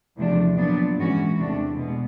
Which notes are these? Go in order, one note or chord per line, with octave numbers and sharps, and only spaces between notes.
E2 C3 F3 A3 D4
A#2 F#3 B3 D4
G#2 E3 G#3 C#4 F#4
E2 C3 E3 A3 D4
B2 G#3